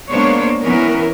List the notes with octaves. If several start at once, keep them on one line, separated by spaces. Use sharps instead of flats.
G#3 A#3 B3 D4 C5 C#5
E3 B3 C#4 A#4